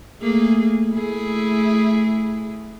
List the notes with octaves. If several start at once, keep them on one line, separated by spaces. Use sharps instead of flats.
A3 A#3 G#4
A3 E4 G#4